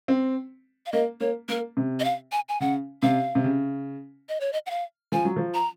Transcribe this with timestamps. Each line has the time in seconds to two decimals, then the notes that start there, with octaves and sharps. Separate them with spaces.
0.08 C4
0.86 F5
0.92 A#3 D#5
1.20 A#3 C#5
1.49 A#3 A#4
1.77 C3
2.00 D#5
2.04 F5
2.32 G#5
2.49 G#5
2.61 C#3 F#5
3.02 C3 F5
3.35 C3
3.44 C#3
4.29 D#5
4.40 C#5
4.53 D#5
4.66 F#5
4.70 F5
5.12 F3 G#5
5.25 F#3
5.36 F3
5.54 A#5